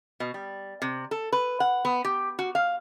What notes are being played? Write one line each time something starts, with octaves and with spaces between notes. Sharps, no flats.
B2
G3
C3
A4
B4
F#5
B3
G4
F#4
F5